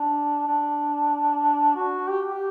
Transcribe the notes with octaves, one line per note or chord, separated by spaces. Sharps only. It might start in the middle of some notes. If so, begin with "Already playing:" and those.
Already playing: D4
D4
F#4
G4
G4